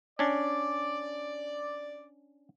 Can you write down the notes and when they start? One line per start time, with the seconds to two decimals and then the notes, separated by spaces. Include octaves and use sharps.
0.19 C#4 D4 D5